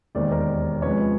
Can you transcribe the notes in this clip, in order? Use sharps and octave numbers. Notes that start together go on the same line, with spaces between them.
E1 D#2 D#3 C5 D5
A#4 C5
C#2 C3 F3 G#3 B4 C#5